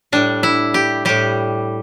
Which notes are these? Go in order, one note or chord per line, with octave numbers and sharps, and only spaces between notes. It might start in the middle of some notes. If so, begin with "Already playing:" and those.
A2 G3 D4
E4
G4
A2 G3 G4